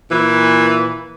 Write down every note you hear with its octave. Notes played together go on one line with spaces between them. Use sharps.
A#2 E3